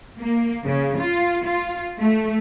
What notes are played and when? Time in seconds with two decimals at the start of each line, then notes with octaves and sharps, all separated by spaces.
0.19 A#3
0.65 C#3
0.99 F4
1.45 F4
1.99 A3